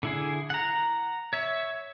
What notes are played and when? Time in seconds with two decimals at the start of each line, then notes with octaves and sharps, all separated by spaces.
0.03 D3 E4 G#4
0.50 F#5 A#5
1.33 C#5 E5